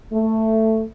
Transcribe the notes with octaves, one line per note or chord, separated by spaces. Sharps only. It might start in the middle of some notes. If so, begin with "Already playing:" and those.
A3